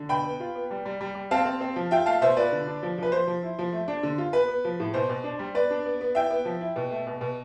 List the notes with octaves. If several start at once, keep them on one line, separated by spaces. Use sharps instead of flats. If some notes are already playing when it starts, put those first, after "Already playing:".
Already playing: D3
B2 G5 B5
B3
F4
B3
G3
G3
G3
G3
C4 F5 A5
C4
C4
F3
F4 E5 G5
A3 F5 A5
B2 C5 E5
F4 B4 D5
D3
D4
F3
F3 B4
F3 C5
F3
E4
F3
A3
D4
D3
F4
B3 B4
B3
F3
A2
B2 C5
B2
D4
G3
B3 B4 D5
D4
B3
B3
E4 E5 G5
B3
F3
E4
B2
A3
B2
B2